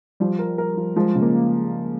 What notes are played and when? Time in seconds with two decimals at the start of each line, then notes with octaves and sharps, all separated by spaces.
0.20 F3 G3
0.39 A#4
0.58 A#4
0.77 F3
0.96 F3 G#3
1.15 C#3
1.22 A#3